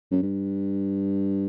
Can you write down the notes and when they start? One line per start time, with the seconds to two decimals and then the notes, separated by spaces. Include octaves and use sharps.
0.12 F#2
0.23 G2